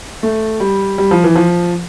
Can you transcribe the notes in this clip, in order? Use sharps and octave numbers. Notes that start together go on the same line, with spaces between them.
A3
G3
G3
F3
E3
F3